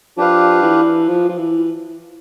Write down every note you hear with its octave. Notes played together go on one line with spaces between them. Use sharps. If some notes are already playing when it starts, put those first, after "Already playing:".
F3 D4 G4 B4 F5
E3
F3
F3
E3